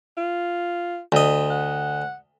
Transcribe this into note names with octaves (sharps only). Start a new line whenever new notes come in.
F4
D2 D#5
F#5